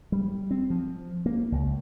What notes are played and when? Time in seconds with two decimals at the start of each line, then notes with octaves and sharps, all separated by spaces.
0.12 G3
0.51 C4
0.70 F3
1.26 A#3
1.52 C#2